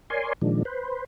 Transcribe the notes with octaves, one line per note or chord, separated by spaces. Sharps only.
A#4 C#5 D5 G#5 C6
A#2 D#3 F3 G#3 D4
B4 C5